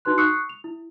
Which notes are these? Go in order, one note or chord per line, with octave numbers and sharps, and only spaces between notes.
D#4 F#4 B4 C6 F#6
C#6 D#6 E6 F#6 C7 C#7
F7
E4